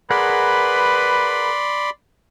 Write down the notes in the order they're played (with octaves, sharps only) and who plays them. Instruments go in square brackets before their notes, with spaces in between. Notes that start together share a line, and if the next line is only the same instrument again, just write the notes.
[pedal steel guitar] G#4 A#4 F#5 [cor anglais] B4 [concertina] D5 B5 C6